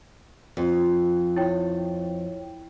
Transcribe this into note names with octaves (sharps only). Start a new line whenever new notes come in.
F2
E4 C#5 G5